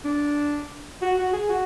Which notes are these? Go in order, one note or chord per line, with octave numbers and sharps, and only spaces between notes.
D4
F#4
F#4
G#4
F#4